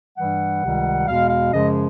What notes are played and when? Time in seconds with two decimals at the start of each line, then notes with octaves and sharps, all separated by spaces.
0.17 G2 E3 G3 F#5
0.63 C#2 C3 D#3 G3
1.08 E2 B2 G#3 F5
1.29 F5
1.52 F#2 C#3 F3 G#3 D#5